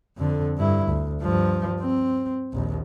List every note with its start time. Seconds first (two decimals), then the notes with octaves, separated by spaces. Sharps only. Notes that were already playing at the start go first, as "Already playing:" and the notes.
0.17 F2 D3
0.58 G2 E4
0.88 D2
1.22 G2 F3
1.81 C4
2.53 A#1 D#2